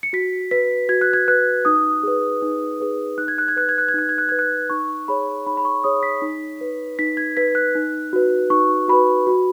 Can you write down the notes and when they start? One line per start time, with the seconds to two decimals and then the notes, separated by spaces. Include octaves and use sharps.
0.03 C#7
0.13 F#4 B6
0.51 B4 B6
0.89 F#4 G#6
1.01 F#6
1.13 G#6
1.28 B4 F#6
1.65 D#4 D#6
2.03 G#4 B4
2.42 D#4
2.80 G#4 B4
3.18 D#4 F#6
3.28 G#6
3.38 F#6
3.48 G#6
3.56 B4 F#6
3.69 G#6
3.78 F#6
3.88 G#6
3.94 D#4 F#6
4.09 G#6
4.18 F#6
4.29 B4 G#6
4.39 F#6
4.70 D#4 C#6
5.08 G#4 C#5 B5
5.47 D#4 B5
5.57 B5
5.65 C#6
5.84 G#4 C#5 D#6
6.03 B6
6.22 D#4
6.61 B4
6.99 D#4 B6
7.17 G#6
7.37 B4 B6
7.55 F#6
7.75 D#4
8.13 F#4 B4
8.50 D#4 C#6
8.88 F#4 B4 B5
9.27 F#4